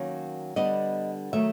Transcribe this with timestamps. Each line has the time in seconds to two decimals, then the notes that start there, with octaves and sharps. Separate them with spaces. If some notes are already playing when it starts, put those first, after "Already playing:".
Already playing: D#3 F#3 A#3 C#4
0.56 D3 G3 B3 D4 D#5
1.33 D#3 F#3 A3 E5